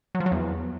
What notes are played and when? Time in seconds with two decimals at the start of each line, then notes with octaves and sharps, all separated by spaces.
0.15 F#3
0.20 F3
0.26 F#3
0.32 E2